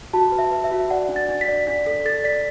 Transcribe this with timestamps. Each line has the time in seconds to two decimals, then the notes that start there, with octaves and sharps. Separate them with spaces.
0.13 F#4 A5
0.32 B4
0.38 E5
0.52 B4
0.64 E5
0.71 F#4
0.90 D5 F#5
1.09 D4
1.16 A6
1.29 D4
1.41 B6
1.48 D5
1.67 D4 B6
1.86 A4 B6
2.05 A4 A6
2.24 D5 B6